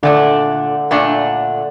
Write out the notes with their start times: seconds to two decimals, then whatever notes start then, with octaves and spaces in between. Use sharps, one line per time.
0.03 A#2 D3 A3 D4
0.91 A#2 A3 D4